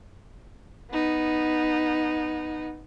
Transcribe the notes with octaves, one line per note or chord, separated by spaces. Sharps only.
B3 D#4